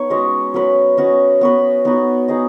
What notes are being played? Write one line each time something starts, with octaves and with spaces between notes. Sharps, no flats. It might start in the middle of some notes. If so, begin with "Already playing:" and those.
Already playing: B3 D#4 C#5
G#3 C#4 F#4 D#5
F#3 C#4 B4
C#4 F#4 D#5
B3 F#4 B4
B3 D#4 F#4 B4
D#4 G#4 D#5